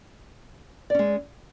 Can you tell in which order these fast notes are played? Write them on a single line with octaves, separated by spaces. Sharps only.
D5 C#4 G#3